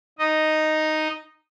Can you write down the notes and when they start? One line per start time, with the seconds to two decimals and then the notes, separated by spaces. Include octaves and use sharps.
0.19 D#4 D#5